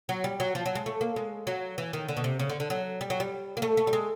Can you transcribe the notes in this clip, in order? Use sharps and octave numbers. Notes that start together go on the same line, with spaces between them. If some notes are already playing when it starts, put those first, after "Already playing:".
F#3
G3
F#3
F3
F#3
G#3
A3
A#3
G#3
F#3
E3
D#3
D3
B2
C3
C#3
D3
D3
F#3
G3
F#3
G3
A#3
A3
A3
G3
G#3